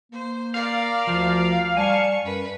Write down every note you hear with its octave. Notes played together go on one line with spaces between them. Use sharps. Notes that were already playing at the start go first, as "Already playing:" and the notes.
A#3 C5
A#4 D5 F5
D2 F3
G3 G#5 A5 C#6
F#2 B4